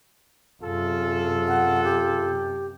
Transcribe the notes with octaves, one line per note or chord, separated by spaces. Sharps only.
F#2 C3 F4 G#4 A4
F#5
G4